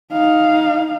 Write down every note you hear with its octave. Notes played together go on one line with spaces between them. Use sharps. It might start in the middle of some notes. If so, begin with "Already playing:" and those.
D#4 F5